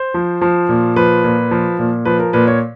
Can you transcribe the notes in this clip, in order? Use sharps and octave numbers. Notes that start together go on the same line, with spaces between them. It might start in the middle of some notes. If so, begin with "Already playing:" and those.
Already playing: C5
F3
F3
A#2
F3 B4
A#2
F3
A#2
F3 B4
A#4
A#2 B4
C#5